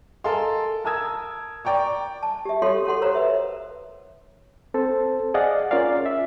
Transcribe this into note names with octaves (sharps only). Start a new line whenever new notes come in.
A4 A#4 D#5 F5 G#5 C6
A#4 A5 D#6 E6 G#6
D5 G5 A#5 C#6
A5
G4 E5
F#4 G4 A4 C#5 F5 C6
A4 C#5 F#5 C6
A#4 C5 C#5 F5 A#5
A#4 B4 E5
C4 A4 C5
G#4 D5 D#5 F5 F#5
C#4 F4 A#4 D5 F5
E5